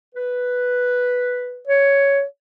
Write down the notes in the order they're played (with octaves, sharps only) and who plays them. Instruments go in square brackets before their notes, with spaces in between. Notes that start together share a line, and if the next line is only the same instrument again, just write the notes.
[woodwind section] B4
[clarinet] C#5